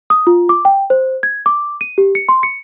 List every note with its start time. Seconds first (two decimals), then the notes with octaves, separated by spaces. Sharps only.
0.10 D#6
0.27 F4
0.49 D6
0.65 G5
0.90 C5
1.23 G#6
1.46 D6
1.81 D#7
1.98 G4
2.15 C#7
2.29 C6
2.43 C#7